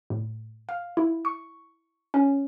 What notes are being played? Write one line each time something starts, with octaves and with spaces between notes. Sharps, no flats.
A2
F5
E4
C#6
C#4